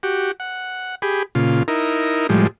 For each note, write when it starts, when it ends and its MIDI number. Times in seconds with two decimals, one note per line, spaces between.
0.03 0.31 66
0.03 0.31 67
0.40 0.95 78
1.02 1.23 67
1.02 1.23 68
1.02 1.23 83
1.35 1.63 46
1.35 1.63 49
1.35 1.63 65
1.68 2.27 63
1.68 2.27 64
1.68 2.27 70
2.29 2.47 45
2.29 2.47 53
2.29 2.47 55
2.29 2.47 56